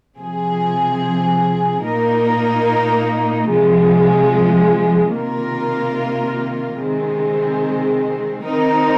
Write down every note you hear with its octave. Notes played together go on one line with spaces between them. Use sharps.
C3 F3 C4 G#4
A#2 A#3 D#4 A#4
C3 F3 G#3
C3 D#3 A#3 F4 A#4
C3 D#3 G#3 C4
D#3 C4 D#4 A#4